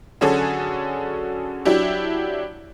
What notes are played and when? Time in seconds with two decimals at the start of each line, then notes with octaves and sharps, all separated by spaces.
0.21 D3 F#3 C#4 F#4 G#4 A4
1.65 F#3 D4 E4 G4